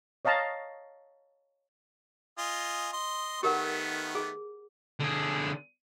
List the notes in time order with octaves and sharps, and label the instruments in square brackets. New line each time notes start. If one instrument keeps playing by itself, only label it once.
[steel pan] C#5 D#5 F5 A5 A#5
[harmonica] F4 D#5 G#5
D#5 C6
[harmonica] D#3 A3 B3 [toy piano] G4 A#4 F#5
[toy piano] G#4
[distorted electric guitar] D3 G#4